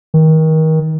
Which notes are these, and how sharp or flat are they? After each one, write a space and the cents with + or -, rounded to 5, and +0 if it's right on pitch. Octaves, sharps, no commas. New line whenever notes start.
D#3 +30